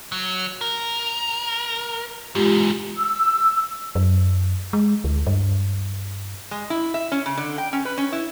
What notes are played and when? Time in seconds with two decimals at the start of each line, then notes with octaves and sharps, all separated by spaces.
0.12 F#3
0.61 A#4
2.35 E2 G#2 G#3 F4 G4
2.96 E6
3.95 F#2
4.73 G#3
5.04 D2
5.27 G2
6.51 G#3
6.70 E4
6.94 E5
7.12 C#4
7.26 C#3
7.37 D3
7.58 G5
7.73 C#4
7.85 B4
7.98 C#4
8.12 E4